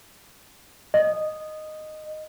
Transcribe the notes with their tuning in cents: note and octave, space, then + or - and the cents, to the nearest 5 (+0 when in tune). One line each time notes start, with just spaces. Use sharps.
D#5 -10